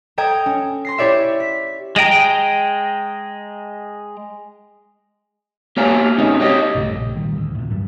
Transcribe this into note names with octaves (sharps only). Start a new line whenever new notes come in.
A4 D#5 G5 A#5 D#6 G#6
C#4
C6 A#6 C7
E4 G4 C#5 D5 E5
B6
G#3 D#5 G5 A#5
A#3 G4 C#5 F5 G#5 A#5
G#2 C#3 C4 C#4 D#4
G4 C#5 D#5
B1 G2 C#3 A3
A#1
A2 D#3 G3
D2
A2 C3
G2 F#3 G3